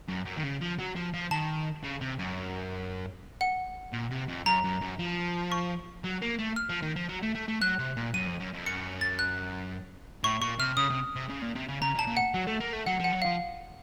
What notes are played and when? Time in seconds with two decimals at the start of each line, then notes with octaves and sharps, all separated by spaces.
0.08 F#2
0.25 F#2
0.37 D#3
0.43 C#3
0.61 F3
0.79 F#3
0.96 F3
1.14 F3
1.31 D#3 A5
1.84 C#3
2.01 C3
2.19 F#2
3.41 F#5
3.93 A#2
4.11 C3
4.29 F2
4.46 F#2 A#5
4.64 F#2
4.81 F#2
4.99 F3
5.52 C#6
6.04 F#3
6.22 A#3
6.39 A3
6.56 F6
6.69 F3
6.82 D#3
6.96 F3
7.09 F#3
7.23 A3
7.35 A3
7.48 A3
7.61 F#3 F#6
7.79 C3
7.97 A#2
8.14 F#2 D#7
8.26 F2
8.40 F#2
8.53 F2
8.66 F#2 C#7
9.01 A6
9.19 F#6
10.23 A2 C#6
10.41 A#2 C#6
10.59 C3 F6
10.77 C#3 D#6
10.90 C3
11.15 C3
11.29 C#3
11.42 A#2
11.55 C3
11.68 C#3
11.82 C#3 A#5
11.95 A#2
11.99 A5
12.07 A#2
12.17 F#5
12.34 F#3
12.47 A3
12.60 A#3
12.73 A3
12.86 F#3 F#5
13.00 F3 F#5
13.13 F#3
13.22 F3 F5